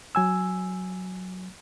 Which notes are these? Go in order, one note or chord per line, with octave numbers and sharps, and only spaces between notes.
F#3 G#5 E6